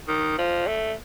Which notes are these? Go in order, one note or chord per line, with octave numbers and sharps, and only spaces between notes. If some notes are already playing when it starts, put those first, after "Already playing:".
D#3
F3
A3